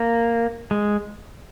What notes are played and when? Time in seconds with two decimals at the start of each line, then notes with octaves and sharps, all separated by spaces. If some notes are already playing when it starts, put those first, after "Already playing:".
Already playing: A#3
0.71 G#3